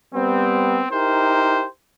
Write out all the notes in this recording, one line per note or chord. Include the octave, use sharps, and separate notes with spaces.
G3 B3 C4
D#4 E4 G4 A#4 C5